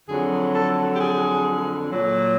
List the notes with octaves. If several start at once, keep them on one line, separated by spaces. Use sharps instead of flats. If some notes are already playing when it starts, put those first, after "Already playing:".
F2 D3 F#3 G#4
A4
G4
G#4
A#2 F#3